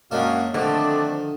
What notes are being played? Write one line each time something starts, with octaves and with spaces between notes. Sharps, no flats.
F#2 G#3 A#3 D4 F#4 F5
D3 D#3 F3 A3 C4 D4 D5